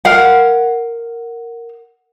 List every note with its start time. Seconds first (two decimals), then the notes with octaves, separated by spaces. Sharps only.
0.05 A#4 F5 F#5